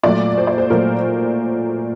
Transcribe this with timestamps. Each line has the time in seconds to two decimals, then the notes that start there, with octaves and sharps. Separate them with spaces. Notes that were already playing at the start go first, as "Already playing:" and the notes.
0.03 A#2 F#3 A3 D5
0.38 C5
0.47 D5
0.58 C5
0.70 A#2 F#3 A3 A#4